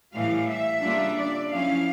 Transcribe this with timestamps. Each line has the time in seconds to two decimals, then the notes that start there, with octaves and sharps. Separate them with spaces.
0.15 A2 E3 G3 F5
0.49 E5
0.83 C#3 G3 A#3 D4 F4
1.18 D5
1.52 F3 C#4 E4 F5